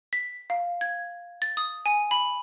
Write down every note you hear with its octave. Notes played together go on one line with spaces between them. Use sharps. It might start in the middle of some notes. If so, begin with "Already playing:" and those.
B6
F5
G#6
A6
D#6
G#5
B5